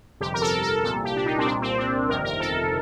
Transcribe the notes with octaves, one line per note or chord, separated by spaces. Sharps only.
G1 F2 C3 G4
A#4
A4
A4
C2 A#2 A4
G4
D4
D#4
C4
C2 A#2 D4
C4
D4
G1 F2 C3 D#3 A#4
A#4
A4